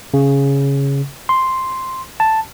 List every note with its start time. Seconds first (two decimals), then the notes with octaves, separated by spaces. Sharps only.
0.14 C#3
1.29 C6
2.20 A5